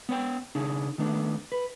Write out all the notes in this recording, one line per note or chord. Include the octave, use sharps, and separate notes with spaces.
B3 C#5 G5
C#3 D4 D#4 G#4
D#3 A3 B3 D4
B4